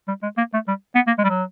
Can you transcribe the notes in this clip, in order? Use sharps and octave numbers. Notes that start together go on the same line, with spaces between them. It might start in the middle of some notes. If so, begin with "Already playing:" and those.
G3
G#3
A#3
A3
G3
B3
A#3
G#3
G3
F#3